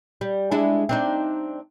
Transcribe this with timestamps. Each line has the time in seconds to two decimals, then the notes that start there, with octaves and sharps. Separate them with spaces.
0.21 G3
0.52 G#3 D4 E4
0.89 C4 D4 D#4